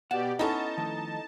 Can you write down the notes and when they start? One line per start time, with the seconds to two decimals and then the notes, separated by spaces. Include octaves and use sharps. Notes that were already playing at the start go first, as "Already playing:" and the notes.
0.11 B2 G4 D5 F#5 A5
0.39 B3 C#4 D#4 E4 A4 A5
0.78 D#3 F3 A3